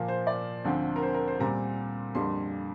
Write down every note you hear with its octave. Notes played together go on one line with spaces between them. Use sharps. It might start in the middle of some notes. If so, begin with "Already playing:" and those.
Already playing: A#2 F3 A#3
C5
D5
D2 D3 F3 C4
A#4
C5
A#4
C5
A#2 G3 C4 A#5
F2 D3 G3 A#3 C6